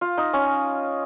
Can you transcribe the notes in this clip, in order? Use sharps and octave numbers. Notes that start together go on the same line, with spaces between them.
F4
D#4
C#4